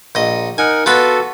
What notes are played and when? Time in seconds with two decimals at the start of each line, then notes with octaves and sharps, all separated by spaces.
0.15 A#1 D#5
0.58 D#4 A#4 F#5 G#5
0.86 B3 F4 F#4 A4 B4